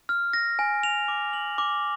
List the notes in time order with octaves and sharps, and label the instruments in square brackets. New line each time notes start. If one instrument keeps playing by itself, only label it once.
[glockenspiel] F6
A#6
G#5
F7
D6
F#7
D6